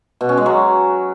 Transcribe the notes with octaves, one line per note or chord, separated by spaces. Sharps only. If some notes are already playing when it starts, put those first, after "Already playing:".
B2
C#4
G#3
F#3